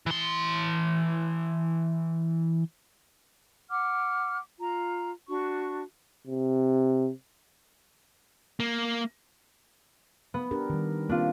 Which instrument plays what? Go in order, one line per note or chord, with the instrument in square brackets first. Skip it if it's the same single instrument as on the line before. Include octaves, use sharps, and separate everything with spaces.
[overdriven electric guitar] E3 C6
[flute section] F#5 D6 F6
F4 A#5
D4 F#4 C#6
[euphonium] C3
[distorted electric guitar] A#3
[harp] B3
[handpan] D4 G4 A#4
D#3 G3
[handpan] A#3 C4 [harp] D4 F4